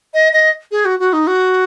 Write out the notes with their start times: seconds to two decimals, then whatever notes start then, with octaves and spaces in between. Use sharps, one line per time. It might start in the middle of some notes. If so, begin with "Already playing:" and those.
0.14 D#5
0.33 D#5
0.71 G#4
0.85 F#4
0.99 F#4
1.13 D#4
1.27 F#4